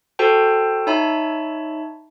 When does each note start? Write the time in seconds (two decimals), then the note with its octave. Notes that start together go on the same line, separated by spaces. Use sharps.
0.19 F#4 A4 C5 G5 A5
0.87 D#4 C#5 E5 A5 B5